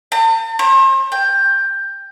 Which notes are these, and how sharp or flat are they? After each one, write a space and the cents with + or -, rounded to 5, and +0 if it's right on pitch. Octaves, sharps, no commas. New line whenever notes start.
A5 +45
C5 +40
G5 +15